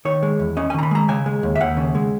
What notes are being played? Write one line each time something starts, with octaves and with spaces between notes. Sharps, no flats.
D#3 C#5
G#3
E2
C#4 D#5
G#5
D#3 A#5
B5
G#3 A#5
C#3 G#5
G#3
D#2
E5
D#2 F#5
C#3
G#3